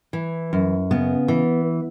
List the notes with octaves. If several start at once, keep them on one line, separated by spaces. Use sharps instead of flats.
E3
F#2
C#3 B3
E3